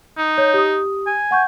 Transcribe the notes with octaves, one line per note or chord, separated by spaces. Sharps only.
D#4
C#5 G6
G4 D#6
G#5
F#5 C#6 G6